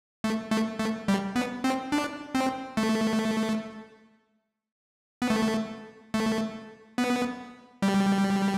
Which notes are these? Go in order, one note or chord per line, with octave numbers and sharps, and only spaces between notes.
A3
A3
A3
G3
B3
C4
D4
C4
A3
B3
A3
A3
B3
G3